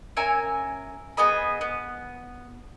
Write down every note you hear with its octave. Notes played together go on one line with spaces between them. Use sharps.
C#4 A#4 E5 G#5
B3 G#4 D#5 B5
B3